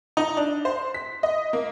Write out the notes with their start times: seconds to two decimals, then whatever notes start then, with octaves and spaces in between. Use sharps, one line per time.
0.17 D#4
0.37 D4
0.65 C5
0.94 B6
1.23 D#5
1.53 A#3